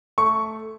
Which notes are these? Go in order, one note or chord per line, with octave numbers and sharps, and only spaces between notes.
A3 C#6